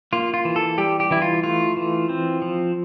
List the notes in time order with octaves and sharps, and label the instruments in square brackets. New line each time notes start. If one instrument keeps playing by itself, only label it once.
[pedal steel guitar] A#3 F4
F4
E3
A4
G3 G4
G4
E3 E4
F4
A3 F4
E3
C4
F3